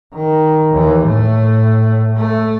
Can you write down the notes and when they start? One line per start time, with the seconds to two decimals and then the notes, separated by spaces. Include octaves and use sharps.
0.14 D#3
0.72 D#2 E3
1.05 A2 A3
2.17 A3